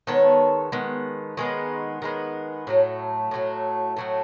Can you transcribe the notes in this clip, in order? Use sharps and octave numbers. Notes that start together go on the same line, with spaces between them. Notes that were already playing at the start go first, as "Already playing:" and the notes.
D#3 G#3 B3 A4 C#5
D#3 G#3 B3
D#3 G#3 B3
D#3 G#3 B3
A2 F#3 A3
A2 F#3 A3
A2 F#3 A3